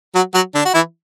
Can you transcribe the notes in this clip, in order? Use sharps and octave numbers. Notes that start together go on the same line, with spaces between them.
F#3 F#4
F#3 F#4
D3 D4
F#4
E3 E4